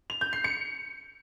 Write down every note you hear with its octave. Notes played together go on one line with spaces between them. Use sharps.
F7
G6
C7
C#7